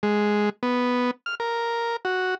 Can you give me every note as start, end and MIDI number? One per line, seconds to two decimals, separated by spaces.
0.03 0.49 56
0.63 1.11 59
1.26 1.35 89
1.40 1.96 70
2.05 2.35 66